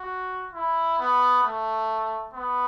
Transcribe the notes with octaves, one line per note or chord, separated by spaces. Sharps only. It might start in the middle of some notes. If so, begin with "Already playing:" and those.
Already playing: F#4
E4
B3
A3
B3